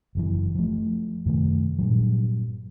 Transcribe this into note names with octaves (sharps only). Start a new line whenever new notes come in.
F#1 F#2 E3
F3 A3
F#2 C3 D#3 A3
G2 A#2 F#3